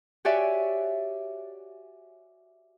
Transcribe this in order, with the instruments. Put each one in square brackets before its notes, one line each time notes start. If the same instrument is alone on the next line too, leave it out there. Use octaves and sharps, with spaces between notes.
[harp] F#4 G4 C#5 D5 E5 G#5